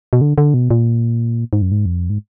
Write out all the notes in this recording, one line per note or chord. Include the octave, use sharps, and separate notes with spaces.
B2
D3
D3
B2
A#2
G#2
F#2
G#2
F2
G#2